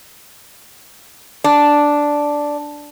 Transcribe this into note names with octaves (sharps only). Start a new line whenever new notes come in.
D4